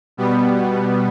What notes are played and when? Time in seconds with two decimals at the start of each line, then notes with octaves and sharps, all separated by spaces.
0.17 B2 G3 B3